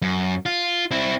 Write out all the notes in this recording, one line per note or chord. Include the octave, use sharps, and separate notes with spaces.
F#2
F4
C4 E4